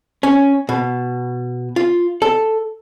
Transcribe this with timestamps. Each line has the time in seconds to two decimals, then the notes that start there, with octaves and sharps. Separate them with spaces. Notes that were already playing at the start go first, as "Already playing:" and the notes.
0.23 C#4
0.69 B2
1.76 F4
2.22 A4